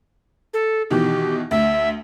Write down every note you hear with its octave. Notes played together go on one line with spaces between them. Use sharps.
A4
B2 D#3 E3 G4
D2 E5